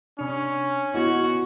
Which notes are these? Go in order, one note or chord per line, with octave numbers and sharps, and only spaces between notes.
C3 C#4 D4
B3 E4 F#4 D#5 G#6